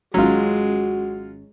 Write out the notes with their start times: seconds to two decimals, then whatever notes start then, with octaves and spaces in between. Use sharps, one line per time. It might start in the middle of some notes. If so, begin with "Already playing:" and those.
0.14 G#1 F#3 G#3 C#4 F4 F#4